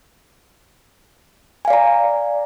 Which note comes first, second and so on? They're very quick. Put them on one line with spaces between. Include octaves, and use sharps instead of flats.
G#5 F5 D5 A#5